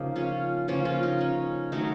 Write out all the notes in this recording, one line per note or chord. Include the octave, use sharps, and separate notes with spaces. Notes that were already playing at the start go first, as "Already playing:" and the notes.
Already playing: C#3 F3 A#3 D#4
C#4 F4
C#3 F3 A#3 C#4 F4
C#4 F4
D#4
C#4
D#3 F#3 A3 D#4